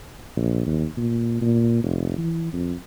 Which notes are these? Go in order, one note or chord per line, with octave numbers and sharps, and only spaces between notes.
A#1
D#2
A#2
A#2
F1
E3
F2